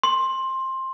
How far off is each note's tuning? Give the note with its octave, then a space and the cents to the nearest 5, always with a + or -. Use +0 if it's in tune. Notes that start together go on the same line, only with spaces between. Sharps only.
C6 +15